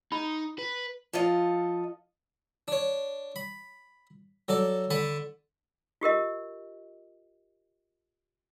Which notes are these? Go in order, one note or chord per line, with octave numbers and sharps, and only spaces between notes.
D#4 B5
B4
F3 F4 A4 D#5
D4 C#5
B5
F#3 A4 D5
D3 A5 B5
F4 G4 A#4 D#5